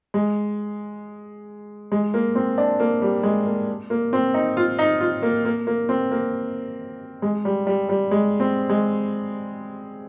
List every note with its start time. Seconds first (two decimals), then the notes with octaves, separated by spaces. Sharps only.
0.14 G#3
1.92 G#3
2.14 A#3
2.35 C4
2.58 D4
2.80 A#3
3.02 G3
3.23 G#3
3.46 A#3
3.90 A#3
4.13 C4
4.34 D#4
4.57 F4
4.79 D#4
5.01 F4
5.22 A#3
5.45 A#3
5.67 A#3
5.89 C4
6.11 A#3
7.22 G#3
7.45 G3
7.67 G3
7.89 G3
8.11 G#3
8.40 C4
8.70 G#3